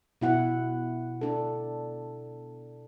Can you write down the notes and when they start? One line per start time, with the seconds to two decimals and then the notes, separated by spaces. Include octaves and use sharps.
0.21 B2 E4 F#5
1.21 D4 A4